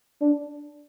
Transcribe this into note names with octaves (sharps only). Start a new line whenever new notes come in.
D4